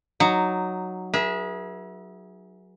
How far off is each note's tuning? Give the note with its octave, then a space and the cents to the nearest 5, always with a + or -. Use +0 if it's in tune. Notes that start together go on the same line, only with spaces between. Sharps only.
F#3 +0 D#4 -5
G#4 +0 B4 -45 E5 +0